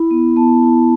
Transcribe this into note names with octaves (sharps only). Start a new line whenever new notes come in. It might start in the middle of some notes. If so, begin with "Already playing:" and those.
Already playing: E4 B5
B3
B3 A5
E4